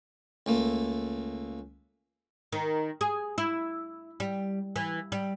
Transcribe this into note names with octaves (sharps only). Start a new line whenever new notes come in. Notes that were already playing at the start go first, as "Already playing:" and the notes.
C#2 A3 A#3
D#3
G#4
E4
G3
E3
G3